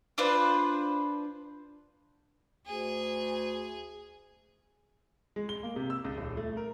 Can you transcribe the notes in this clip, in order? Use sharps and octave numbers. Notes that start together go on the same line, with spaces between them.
D4 F4 B4 C5
D2 G#4
G#3
G7
A#3
C3
E6
C#2
D#1
A3
A#4